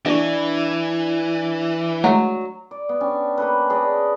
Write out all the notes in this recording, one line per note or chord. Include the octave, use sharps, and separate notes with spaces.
E3 D4 D#5 C#6
F#3 G#3 A3
D5
B3
C#4 D4 G4
A#3 A4 B4
G#4 B4 D5 D#5